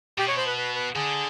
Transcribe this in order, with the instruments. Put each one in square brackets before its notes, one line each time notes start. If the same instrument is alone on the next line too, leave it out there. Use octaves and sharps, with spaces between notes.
[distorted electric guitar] B2 [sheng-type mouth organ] G4
[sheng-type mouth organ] C#5
C5
B4
B4
B4
[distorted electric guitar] D3 [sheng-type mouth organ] G#4